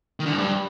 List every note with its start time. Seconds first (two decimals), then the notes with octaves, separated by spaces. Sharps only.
0.20 D#3
0.26 D3
0.32 F#2
0.38 G2